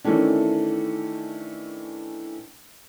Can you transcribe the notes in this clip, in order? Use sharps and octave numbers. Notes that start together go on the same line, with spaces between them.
D#3 E3 A3 C#4 D4